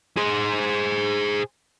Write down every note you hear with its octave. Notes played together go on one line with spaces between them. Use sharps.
G#4 C5